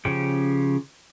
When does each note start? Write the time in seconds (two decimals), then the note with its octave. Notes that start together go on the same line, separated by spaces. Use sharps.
0.05 C#3 F3 C#4 G4